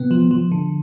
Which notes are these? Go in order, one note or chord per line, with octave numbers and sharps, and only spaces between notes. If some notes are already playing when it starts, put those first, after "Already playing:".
Already playing: C3 B3
F3
F3
D3